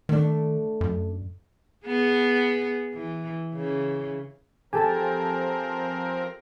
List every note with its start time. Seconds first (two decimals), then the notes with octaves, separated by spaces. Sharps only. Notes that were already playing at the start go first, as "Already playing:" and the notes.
0.09 D#3 A3 D4
0.81 F#2
1.86 B3 G#4
2.94 E3
3.53 C#3 E3
4.73 F3 C4 G4 A4 A#4 G#5 A5